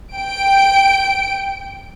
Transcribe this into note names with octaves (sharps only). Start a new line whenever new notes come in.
G5 D7